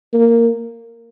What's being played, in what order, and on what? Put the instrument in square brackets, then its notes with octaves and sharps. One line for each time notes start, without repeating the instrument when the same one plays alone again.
[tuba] A#3